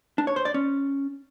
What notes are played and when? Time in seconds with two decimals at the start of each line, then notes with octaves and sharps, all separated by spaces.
0.18 D4
0.27 C#5
0.36 C5
0.45 D5
0.54 C#4